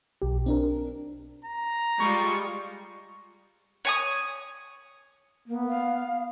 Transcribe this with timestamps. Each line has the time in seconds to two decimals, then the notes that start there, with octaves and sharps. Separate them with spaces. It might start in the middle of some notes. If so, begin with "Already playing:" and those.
0.22 B1 G4
0.46 C4 D4 A#4
1.44 A#5
2.00 G3 G#3 F4 C#6
3.85 C#5 G#5 D#6
5.48 A#3 B3
5.68 F5